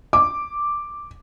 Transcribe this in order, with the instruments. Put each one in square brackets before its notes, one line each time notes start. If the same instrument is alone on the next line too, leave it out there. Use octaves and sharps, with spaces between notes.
[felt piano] D6